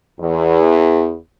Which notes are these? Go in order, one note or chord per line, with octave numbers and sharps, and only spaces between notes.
E2